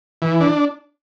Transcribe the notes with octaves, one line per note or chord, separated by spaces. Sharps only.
E3
D4